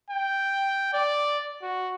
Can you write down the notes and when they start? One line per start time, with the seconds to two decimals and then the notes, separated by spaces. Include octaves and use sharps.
0.10 G5
0.93 D5
1.62 F#4